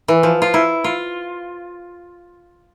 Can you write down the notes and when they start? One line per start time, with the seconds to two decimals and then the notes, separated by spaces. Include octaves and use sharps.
0.08 E3
0.23 F3
0.42 F4
0.54 E4
0.84 F4